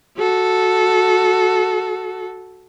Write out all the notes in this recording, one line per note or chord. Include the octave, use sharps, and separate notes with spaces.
F#4 A4